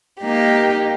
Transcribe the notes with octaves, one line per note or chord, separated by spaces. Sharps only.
A#3 D#4 G4